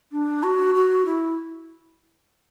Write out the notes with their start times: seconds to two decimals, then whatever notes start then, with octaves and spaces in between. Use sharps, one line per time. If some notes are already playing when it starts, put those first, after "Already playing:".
0.12 D4
0.43 F#4
0.75 F#4
1.05 E4